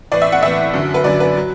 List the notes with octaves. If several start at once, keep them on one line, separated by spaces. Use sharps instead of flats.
A2 E3 D5
E5
F#5
A2 E3 E5
F#2 D3 F#3
B4
F#2 D3 F#3 D5
B4
F#3